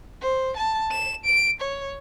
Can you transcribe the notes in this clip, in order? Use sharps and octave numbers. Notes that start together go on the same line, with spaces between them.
C5
A5
E7
D7
C#5